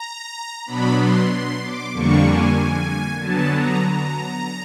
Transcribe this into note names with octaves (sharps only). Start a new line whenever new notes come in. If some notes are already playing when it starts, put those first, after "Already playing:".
Already playing: A#5
B2 F#3 B3 D4 B5
C6
C6
D6
F2 D3 G3 A#3 D4 C#6
G#5
D3 F#3 B3 A5
A#5
A#5